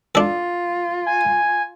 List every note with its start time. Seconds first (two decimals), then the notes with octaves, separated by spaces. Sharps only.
0.15 D4 F4 A4
1.06 G#5